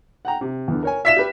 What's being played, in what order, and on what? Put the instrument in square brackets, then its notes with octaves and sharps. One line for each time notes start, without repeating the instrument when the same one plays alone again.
[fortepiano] F#5 G5 A#5
C3
E2 D3
A#4 C#5 G#5
[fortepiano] F4 D5 [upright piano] E5 B6 E7
[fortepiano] G4 B4